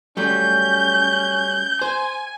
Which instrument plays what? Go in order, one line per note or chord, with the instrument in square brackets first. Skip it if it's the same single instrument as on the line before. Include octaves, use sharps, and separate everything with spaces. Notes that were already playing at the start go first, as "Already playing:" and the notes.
[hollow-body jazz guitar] F#3 G3 A3 [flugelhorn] C#4 [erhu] G6
[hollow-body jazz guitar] C5 [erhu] G#5